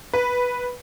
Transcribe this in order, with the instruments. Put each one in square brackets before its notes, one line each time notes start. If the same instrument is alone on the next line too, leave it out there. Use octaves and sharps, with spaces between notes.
[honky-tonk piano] B4